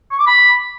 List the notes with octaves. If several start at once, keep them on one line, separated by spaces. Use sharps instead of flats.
C#6
D6
B5